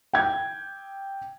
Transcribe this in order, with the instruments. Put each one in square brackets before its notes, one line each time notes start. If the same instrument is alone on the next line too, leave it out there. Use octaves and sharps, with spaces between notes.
[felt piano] G5 G#6